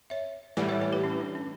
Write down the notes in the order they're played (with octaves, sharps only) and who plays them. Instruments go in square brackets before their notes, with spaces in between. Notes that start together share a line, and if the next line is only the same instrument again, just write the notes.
[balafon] C#5 E5
[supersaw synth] A2 E3 G3 [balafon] D5 F#5
[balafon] C#5 E5
A4 C#5
G4 B4
C#4 E4
D4
C#4